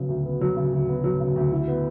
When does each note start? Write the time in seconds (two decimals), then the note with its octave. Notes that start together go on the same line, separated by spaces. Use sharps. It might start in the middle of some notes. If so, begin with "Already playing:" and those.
Already playing: C#3 F#3 B3
0.09 D2
0.26 B3
0.41 F#3
0.57 C#3
0.73 D2
0.88 B3
1.04 F#3
1.20 C#3
1.36 D2
1.52 E4
1.68 B3